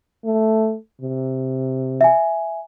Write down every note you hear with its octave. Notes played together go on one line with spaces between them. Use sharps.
A3
C3
E5 G#5